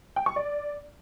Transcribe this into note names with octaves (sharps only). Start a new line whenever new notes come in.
G5
C#6
D5